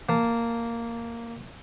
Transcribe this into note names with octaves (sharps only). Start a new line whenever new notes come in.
A#3 A5